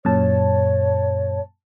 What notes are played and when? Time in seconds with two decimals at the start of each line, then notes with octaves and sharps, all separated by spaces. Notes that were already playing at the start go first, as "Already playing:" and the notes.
0.05 F#2 A#2 C#5 A5